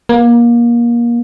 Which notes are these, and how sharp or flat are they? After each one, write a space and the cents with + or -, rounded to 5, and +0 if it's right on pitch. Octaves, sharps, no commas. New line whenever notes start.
A#3 +25